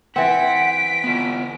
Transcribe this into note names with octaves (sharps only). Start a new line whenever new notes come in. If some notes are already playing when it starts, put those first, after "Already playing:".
E3 C4 F#5 B6 D7
B3 F4